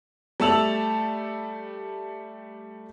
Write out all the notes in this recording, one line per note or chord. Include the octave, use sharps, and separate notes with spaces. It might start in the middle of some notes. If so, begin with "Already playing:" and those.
G3 A3 A5 E6 F7 F#7